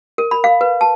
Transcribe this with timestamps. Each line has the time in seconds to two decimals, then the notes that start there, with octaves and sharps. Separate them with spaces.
0.18 A#4
0.31 B5
0.44 F5
0.61 B4
0.81 A5